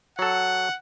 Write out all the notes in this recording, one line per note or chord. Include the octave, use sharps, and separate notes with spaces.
F#3 A4 F#5